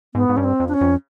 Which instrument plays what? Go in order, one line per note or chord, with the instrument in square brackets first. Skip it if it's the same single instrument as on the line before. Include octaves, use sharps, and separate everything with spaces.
[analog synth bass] G#2 [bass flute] B3
[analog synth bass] G#2
[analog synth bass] G2 [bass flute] C#4
[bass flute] C4
[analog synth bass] F2
[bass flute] D4
C#4
[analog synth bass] F2